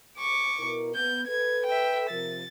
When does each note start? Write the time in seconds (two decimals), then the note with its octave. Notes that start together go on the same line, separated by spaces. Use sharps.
0.19 C#6 D6
0.58 B2 E4 A#4
0.95 B3 G6
1.27 A4 B4 G#6
1.66 E5 G5
2.10 C3 F3 A#4 A6